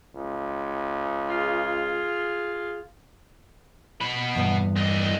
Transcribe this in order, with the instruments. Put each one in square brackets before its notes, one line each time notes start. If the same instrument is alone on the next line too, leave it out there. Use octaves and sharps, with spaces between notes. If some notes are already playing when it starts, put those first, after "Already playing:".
[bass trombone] C#2
[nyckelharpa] F4 G#4
[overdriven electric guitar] B2 B5
[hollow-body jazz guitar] E2 G2 B3
[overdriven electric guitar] D3 D#5